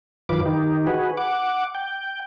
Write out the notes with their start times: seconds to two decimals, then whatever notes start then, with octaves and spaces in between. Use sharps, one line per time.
0.29 F#2 D#3 F4 B4 D6
0.46 D#3 D#4 G4
0.87 F#4 G#4 B4
1.17 F#5 D6
1.75 G5